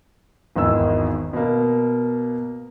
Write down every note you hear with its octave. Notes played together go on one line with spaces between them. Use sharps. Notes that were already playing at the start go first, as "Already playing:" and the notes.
G#1 E2 D#3 E6
B2 A#3